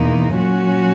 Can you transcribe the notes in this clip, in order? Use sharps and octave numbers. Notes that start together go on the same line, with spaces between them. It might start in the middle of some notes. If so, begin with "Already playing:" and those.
Already playing: E2 B2 A#3 D#4
A#2 F#3 C#4 F#4